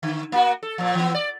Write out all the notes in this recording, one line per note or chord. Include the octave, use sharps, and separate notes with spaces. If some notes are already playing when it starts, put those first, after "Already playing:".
D3
A#3 F#4
A4
A#2 F3
E3 B3
D5